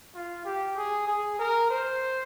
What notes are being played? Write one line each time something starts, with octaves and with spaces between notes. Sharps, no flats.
F4
G4
G#4
G#4
A#4
C5